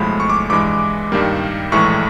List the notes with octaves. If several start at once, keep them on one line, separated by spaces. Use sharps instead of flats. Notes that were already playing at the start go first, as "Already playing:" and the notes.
Already playing: B1 A2 F3 G#3 B5
C#6
D6
G2 E3 G#3 D6
G2 D#3 G3 A#3
A#1 A2 E3 G#3 C#6